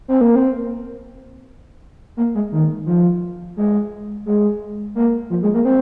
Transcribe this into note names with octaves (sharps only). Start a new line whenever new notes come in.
C4
A#3
C4
A#3
G#3
D#3
F3
G#3
G#3
A#3
F3
G#3
A#3
C4